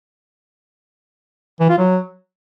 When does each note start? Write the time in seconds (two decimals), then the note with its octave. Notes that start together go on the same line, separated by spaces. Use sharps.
1.60 E3
1.69 F4
1.78 F#3